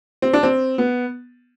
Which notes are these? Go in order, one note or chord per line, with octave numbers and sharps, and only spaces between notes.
C4
D4
C4
B3